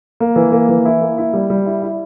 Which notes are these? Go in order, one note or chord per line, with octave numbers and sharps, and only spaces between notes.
A#3
E3
A#3
E3
E4
A#3
E4
G3
G3
E4
E4